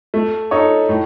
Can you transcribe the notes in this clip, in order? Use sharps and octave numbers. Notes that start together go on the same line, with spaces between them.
A3
D#4 A4 C#5
A2